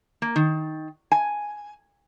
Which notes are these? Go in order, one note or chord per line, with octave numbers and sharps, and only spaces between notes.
A#3
D#3
G#5